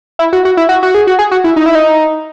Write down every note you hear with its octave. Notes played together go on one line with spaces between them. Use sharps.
E4
F#4
F#4
E4
F#4
F#4
G#4
F#4
G#4
F#4
E4
D#4
E4
D#4